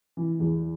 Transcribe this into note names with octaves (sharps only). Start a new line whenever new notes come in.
E3
E2